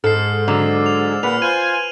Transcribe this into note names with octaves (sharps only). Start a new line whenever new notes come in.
G#2 A4 F6 C7
D3 F#3 D5 E6
F7
A#2 B4 F#5 F6 F7
F4 C5 G#5 D#7